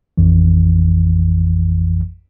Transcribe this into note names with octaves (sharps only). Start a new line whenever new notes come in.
A1 F2 E3